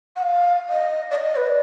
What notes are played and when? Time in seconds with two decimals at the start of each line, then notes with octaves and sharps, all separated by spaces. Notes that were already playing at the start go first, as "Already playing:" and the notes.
0.16 F#5
0.22 F5
0.69 D#5
1.10 D5
1.15 D#5
1.35 B4
1.46 D5